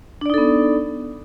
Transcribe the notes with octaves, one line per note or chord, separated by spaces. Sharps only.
B3 D4 D#4 A4 D5